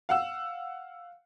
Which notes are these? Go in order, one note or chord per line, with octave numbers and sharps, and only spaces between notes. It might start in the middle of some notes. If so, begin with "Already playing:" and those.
F5 F#5 E6